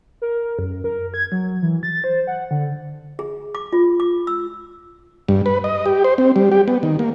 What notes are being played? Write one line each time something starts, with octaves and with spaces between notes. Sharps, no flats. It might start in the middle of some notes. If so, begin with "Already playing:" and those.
A#4
F#2
A#4
G#6
F#3
E3
A6
C5
F#5
D3
G#4
D6
F4
D6
E6
G2
B4
D#5
G4
C5
C4
G3
G4
B3
D#3
A#3